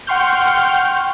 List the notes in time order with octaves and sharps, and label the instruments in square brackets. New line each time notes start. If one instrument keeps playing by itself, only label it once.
[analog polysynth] F#5 G5 C6 C#6 F6 G6